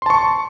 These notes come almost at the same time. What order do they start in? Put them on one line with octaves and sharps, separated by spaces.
C6 A5 C#6